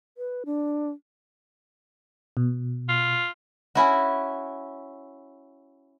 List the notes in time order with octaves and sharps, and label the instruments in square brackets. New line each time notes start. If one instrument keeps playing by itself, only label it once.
[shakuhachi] B4
D4
[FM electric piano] B2
[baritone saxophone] F4
[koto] C#4 E4 F#4